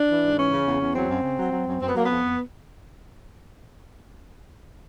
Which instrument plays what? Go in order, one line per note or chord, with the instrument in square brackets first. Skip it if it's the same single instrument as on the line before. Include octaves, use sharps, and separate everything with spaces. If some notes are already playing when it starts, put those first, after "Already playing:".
Already playing: [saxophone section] D4
E3
G#2
E3 C#4
C#3
E2
E2
F#3 C4
F#2
C#3
F#3
F#3
F#2
F#2 C4
B3
F#3 A#3
F2 B3
F2